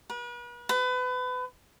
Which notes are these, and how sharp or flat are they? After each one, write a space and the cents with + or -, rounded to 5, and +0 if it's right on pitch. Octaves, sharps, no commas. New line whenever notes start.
B4 -40
B4 +30